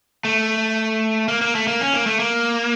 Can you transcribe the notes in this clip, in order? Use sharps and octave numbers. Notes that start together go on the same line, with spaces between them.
A3
A#3
A#3
A3
A#3
C#4
A#3
A3
A#3